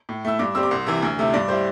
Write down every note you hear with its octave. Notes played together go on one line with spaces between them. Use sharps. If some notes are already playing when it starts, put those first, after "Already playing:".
A2
A3 E4 E6
G2 D6
G3 C4 E6
D6
C2 C6
C3 E3
D2
C3 A3 E4
G2 D5
G3 E4 C5